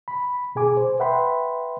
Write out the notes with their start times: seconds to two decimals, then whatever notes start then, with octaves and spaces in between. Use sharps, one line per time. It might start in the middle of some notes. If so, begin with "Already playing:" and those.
0.08 B5
0.55 B2 G#4 G#5 D6
0.77 C5
0.99 B4 E5 F#5 G5 B5 C6